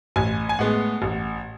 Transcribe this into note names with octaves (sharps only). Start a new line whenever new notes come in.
A1 G#5
G#5
A2 G#3 B3 F#5
A1